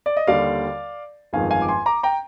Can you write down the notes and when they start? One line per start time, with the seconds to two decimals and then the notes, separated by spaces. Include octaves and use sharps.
0.06 D5
0.17 D#5
0.27 D#2 D3 G3 D5 F5
1.33 G1 F2 D#3 G#3 F5 G#5
1.50 F5 G#5
1.62 D6
1.68 G#5 C6
1.86 A#5 D6
2.03 G5 A#5